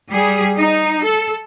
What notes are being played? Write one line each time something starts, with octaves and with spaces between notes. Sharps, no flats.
G3 G#4
D#4
A4